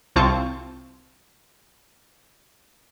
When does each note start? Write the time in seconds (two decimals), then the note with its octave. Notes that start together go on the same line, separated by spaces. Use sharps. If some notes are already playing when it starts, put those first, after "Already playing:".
0.16 C2 C4 F4 A5 C#6 G6